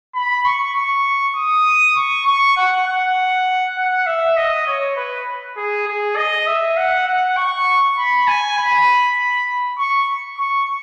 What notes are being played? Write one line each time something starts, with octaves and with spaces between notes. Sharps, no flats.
B5
C#6
C#6
D#6
C#6
C#6
F#5
F#5
F#5
E5
D#5
C#5
B4
G#4
G#4
D#5
E5
F#5
F#5
C#6
B5
G#5
B5
C#6
C#6